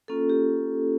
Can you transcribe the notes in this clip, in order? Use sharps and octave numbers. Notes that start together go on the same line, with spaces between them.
A#3 C#4 F4 A4
G4